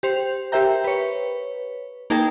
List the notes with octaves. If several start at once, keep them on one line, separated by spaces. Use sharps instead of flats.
G4 C5 F7
G4 A#4 C5 E5 G5 A#5
B4 C#5
A#3 D#4 G#4 A#4 G5 A5